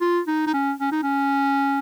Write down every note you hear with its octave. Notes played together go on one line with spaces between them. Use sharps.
F4
D#4
D#4
C#4
C#4
D#4
C#4